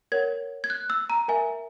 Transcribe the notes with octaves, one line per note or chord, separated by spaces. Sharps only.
A#4 C#5 F#5 G#6
G#6
F#6
E6
A#5
A#4 E5 G#5